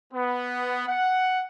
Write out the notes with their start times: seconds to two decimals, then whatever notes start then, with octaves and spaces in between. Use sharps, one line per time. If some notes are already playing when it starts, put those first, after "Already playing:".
0.13 B3
0.88 F#5